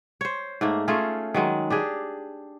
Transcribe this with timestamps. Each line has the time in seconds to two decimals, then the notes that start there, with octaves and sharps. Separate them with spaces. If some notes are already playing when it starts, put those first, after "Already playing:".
0.21 C5 C#5
0.61 G#2 A3 A#3
0.88 A3 C#4 F4 G#4
1.34 D#3 F#3 G#3
1.70 D4 G4 G#4